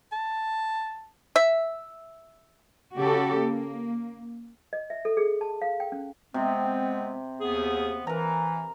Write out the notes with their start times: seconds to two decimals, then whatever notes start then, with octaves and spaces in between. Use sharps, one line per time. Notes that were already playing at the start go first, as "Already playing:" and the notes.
0.12 A5
1.36 E5
2.97 C#3 F#4 G4 A4
3.38 A#3
4.73 D#5
4.90 E5
5.05 A4
5.17 G#4
5.41 A5
5.62 F5
5.80 G5
5.92 C#4
6.34 C3 G#3 B3 C4
7.40 D#2 B3 G#4
8.07 E3 A#4 A#5